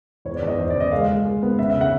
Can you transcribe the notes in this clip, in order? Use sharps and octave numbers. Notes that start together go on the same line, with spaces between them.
E2 C#5
D5
E2 D#5
E2 C5
D5
C#3
D#5
G#3 F5
G#3
G#3
B3
C#3 E5
E5
C#3
F#5